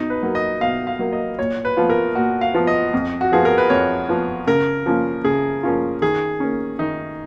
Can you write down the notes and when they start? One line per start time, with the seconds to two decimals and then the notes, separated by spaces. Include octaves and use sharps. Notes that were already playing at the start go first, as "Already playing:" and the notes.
Already playing: B2 D#4
0.10 B4
0.23 F#3 A#3
0.35 D#5
0.61 B2 F5
0.87 F5
0.99 F#3 A#3
1.13 D#5
1.38 A#2 C#5
1.65 B4
1.77 F3 B3 F4
1.90 A#4
2.15 A#2 F#4
2.41 F5
2.54 F3 B3 F4
2.67 D#5
2.93 F2
3.21 F#4
3.32 F3 B3 F4 G#4
3.45 A#4
3.58 B4
3.70 F2 C#5
4.09 F3 B3 F4
4.47 C#3 A#4
4.86 F3 A#3 C#4 F4
5.24 C#3 G#4
5.63 F3 A#3 C#4 F4
6.02 D#3 G#4
6.40 A#3 C#4
6.79 D#3 D#4